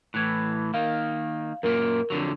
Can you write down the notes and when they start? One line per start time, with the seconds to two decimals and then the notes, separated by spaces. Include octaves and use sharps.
0.14 A2 E3 F#6 G#6
0.74 D#3 A#3 F5
1.63 F#2 A#2 A#3 A#4
2.10 F2 D3 F#3